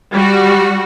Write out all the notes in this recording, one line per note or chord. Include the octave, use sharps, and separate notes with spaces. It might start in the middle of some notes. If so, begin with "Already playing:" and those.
G3 F#4